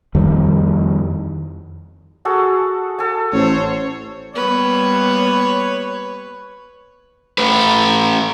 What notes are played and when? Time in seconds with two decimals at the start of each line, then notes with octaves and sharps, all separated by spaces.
0.15 F2 D#3 G3
2.25 F#4 G#4 A4
2.99 A4 G#5
3.33 A1 C5 C#5
4.35 G3 A#3 B3 B4 C#5
7.38 A3 B4